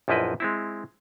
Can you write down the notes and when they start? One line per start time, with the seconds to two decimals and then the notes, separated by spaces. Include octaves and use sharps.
0.08 A#1 F#2 F3 E4 B4 D#5
0.40 G#3 C4 E4